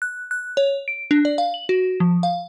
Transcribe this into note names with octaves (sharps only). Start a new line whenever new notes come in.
F#6
F#6
C#5
D7
D4
D5
F5
F#7
F#4
F3
F5